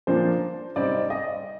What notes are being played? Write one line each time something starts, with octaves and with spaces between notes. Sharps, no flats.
A#2 F3 A#3 D4 C5
C3 G3 C4 D#4 D5
D#5